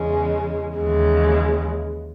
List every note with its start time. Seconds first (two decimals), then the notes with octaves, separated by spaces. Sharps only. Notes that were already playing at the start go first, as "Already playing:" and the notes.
Already playing: E2 C#3 G#3
0.78 D#2 C#3 E3 G#3